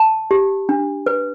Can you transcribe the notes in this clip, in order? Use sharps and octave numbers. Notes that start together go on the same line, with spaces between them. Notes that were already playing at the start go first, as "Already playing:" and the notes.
Already playing: A5
G4
D4
B4